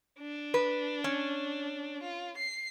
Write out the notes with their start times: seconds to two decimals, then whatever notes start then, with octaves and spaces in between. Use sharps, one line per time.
0.19 D4
0.54 B4
1.04 C#4
2.03 F4
2.37 C7